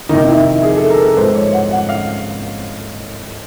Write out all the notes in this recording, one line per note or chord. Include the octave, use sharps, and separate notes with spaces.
F2 C3 D#3 D#4
E4
G#4
A4
A#4
B4
G#2 F3 C5
C#5
F#5
F#5
F5